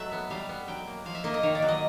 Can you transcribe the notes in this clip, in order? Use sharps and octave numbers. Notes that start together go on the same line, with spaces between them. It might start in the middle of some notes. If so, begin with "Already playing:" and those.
Already playing: F#3 A3 E5
B3
G3 F5
B3
F#3 G5
A#3
F3 F5
E5
A#3 D#5
D#5
D#3 C#5
D5
F#3
D#5